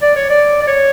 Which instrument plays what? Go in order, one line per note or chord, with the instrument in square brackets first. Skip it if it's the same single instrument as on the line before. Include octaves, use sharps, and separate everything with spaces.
[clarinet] D5
C#5
D5
D5
C#5